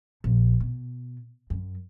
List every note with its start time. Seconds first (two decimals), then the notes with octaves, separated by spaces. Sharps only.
0.24 A#1
0.60 B2
1.50 F#2